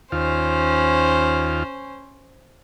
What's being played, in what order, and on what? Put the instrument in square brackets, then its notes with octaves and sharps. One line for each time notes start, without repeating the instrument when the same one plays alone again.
[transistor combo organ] D#2 F4 [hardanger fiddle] C#4 C5